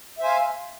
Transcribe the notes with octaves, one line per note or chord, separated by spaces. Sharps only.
C5 E5 F5 G#5